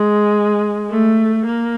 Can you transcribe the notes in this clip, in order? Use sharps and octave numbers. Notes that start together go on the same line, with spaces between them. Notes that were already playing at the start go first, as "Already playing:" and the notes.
Already playing: G#3
A3
A#3